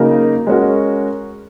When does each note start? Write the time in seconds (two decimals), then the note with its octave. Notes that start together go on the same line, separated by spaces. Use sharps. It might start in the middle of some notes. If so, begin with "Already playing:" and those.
Already playing: C#3 F#3 A#3 D#4 A#4
0.47 G#3 C#4 F#4 A#4